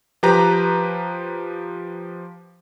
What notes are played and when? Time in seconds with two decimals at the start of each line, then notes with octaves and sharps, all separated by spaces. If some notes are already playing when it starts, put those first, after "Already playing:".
0.23 F3 G4 B4 A#5